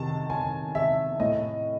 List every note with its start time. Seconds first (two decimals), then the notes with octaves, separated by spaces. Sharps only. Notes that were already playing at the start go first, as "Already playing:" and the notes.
Already playing: C3 D#3 A5
0.30 C3 G#5
0.75 C3 E5
1.20 A2 D#5